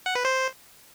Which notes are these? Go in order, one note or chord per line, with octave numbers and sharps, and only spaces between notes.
F#5
B4
C5